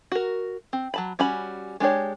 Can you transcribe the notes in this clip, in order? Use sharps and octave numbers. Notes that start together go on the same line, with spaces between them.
F#4 A#4
C4
F#3 A5 B5
G3 C#4 F#4 B5
G#3 D4 G4 C#5